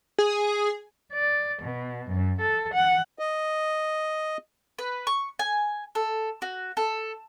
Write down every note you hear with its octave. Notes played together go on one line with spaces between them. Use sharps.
G#4
D5
B2
F#2
A4
F#5
D#5
B4
C#6
G#5
A4
F#4
A4